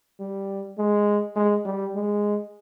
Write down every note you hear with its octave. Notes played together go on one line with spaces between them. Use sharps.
G3
G#3
G#3
G3
G#3